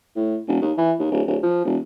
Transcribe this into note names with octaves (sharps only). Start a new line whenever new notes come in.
A2
E1
D#2
E3
D#2
D1
D1
F3
E1